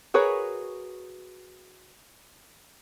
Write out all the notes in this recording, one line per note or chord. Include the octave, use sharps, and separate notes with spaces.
F#4 G#4 A#4 B4 C#5